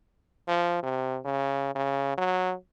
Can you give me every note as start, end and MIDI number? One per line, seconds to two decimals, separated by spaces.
0.47 0.81 53
0.82 1.19 48
1.25 1.75 49
1.75 2.15 49
2.18 2.54 54